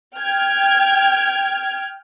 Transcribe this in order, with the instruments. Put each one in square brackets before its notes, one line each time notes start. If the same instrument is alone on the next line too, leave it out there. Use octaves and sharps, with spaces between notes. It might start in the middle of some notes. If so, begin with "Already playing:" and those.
[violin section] G5 F6 G#6